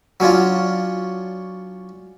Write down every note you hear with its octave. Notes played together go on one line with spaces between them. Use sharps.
F#3 C#4 D4 F4